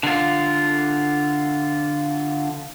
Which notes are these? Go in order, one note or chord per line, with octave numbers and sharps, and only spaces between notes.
D3 F4